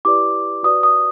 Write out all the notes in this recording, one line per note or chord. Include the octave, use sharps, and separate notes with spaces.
E4 G4 B4 D5 D6
F#4 B4 D5 D#6
D#6